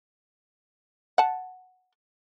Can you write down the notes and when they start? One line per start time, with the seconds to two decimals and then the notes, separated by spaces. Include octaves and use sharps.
1.18 F#5 A5